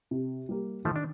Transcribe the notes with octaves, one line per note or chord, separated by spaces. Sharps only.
C3
G3 A#3
D#3 F3 A3
D4